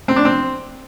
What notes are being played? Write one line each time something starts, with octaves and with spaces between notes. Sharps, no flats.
C4
D4
C4